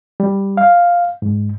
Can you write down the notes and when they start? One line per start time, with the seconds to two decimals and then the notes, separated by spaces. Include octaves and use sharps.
0.20 G3
0.57 F5
1.22 G#2